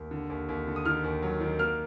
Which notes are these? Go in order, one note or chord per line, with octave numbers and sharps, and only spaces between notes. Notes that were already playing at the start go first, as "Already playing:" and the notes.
Already playing: D#2
D3
D#2
D#2
D3
D#6
D#3 F6
D#2
F#3
D#3
A#3 F6